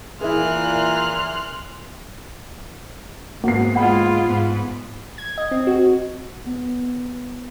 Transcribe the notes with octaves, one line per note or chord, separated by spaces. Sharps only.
A#2 E3 E4 G#4 A#4 C6 F6 F#6
G#2 A#3 B3 F#4 C7
G#3 F4 F#5 B5
G#2 B3
G#6
D#5
C4
F#4
B3